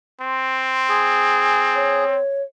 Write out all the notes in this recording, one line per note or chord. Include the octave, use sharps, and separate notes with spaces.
C4 C6
G#4
G#5
C#5